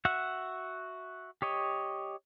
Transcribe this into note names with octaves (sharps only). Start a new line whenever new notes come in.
F#4 E5 F#5
G4 C#5 D#5